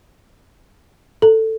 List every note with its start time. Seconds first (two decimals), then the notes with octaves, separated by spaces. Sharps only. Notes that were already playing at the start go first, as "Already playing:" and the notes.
1.22 A4